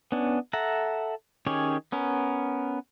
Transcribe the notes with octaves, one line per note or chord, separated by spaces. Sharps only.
B3 C#4 D4
A4 E5 F#5 A#5
D#3 C#4 G4 G#4 C#5
B3 C#4 A#4